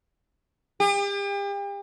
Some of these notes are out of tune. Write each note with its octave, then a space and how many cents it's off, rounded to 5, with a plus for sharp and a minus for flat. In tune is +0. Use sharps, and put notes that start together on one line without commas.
G4 +40